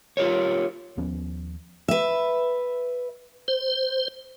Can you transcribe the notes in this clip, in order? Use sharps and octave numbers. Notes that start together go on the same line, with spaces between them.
F4 G4 A#4 C#5
D#2 F3 B3 C#4
B4 E5
C5